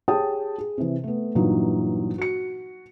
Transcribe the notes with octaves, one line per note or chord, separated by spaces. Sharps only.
G4 G#4 C#5 G5 A5 D#6
G#4
C3 E3
A3 B3
G2 A#2 E3 F#3 D#4 F4
F#4 C#7